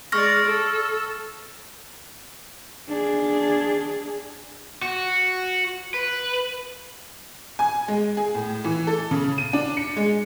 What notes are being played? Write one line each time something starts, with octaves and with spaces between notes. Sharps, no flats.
G#3 D5 C#6 F6 A#6
A4
D4 G#4
F#4
B4
G#5
G#3
G#4
A2
E3
A4
C#3
D#7
D4
C#7
G#3